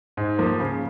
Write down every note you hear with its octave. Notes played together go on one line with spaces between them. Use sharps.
G#2
F3 A#3
C#3